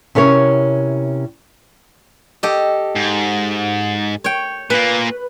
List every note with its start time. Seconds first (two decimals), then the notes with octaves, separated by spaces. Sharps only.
0.15 C3 C#4 E4 A#4 C#5
2.43 G4 A4 D#5
2.96 G#2
4.24 C#5 G5
4.70 A#2 A#3 B4